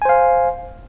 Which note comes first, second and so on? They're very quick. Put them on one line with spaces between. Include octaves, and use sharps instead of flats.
G#5 C5 F5